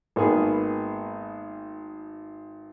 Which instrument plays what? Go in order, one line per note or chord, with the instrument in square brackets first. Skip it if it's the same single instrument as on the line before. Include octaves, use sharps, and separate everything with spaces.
[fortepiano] G#1 A#3 B3 G#4